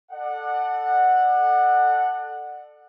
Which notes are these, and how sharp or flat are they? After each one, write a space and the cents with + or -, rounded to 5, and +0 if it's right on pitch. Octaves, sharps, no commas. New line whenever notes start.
A4 +0 D5 +35 F#5 -5